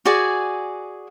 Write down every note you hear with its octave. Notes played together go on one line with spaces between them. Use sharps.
F#4 G#4 D5 G#5